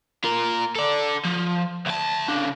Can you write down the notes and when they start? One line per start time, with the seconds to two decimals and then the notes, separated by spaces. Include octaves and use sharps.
0.24 F4 A#4
0.76 A4 D5
1.25 F3
1.86 D2 A5
2.28 C#3 D4